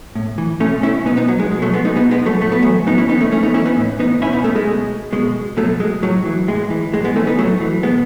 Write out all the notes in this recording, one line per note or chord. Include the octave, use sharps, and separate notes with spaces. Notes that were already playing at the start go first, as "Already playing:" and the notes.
A2
E3
B2 A3 C#4
C#4 E4
B2 B3 D#4
B3 D#4
F#3
G#3
B2 G#3
F#3 A3
G#3 B3
B3 D#4
B2 B3 D#4
G#3 B3
F#3 A3
A2 A3
B3
E3 F#3 A3
A2 B3 D#4
C#4 E4
E3 B3 D#4
A3 C#4
A2 A3 C#4
B3 D#4
E3 C#4 E4
B3 D#4
A2
E3 B3 D#4
B2 C#4 E4
B3 D#4
A3 C#4
G#3
B2
B2 G#3
B2 F#3 A3
G#3
A2 F#3
E3
A2 G#3
E3
A2 G#3
G#3 B3
E3 A3 C#4
B3 D#4
A2 F#3 A3
E3
B2 G#3 B3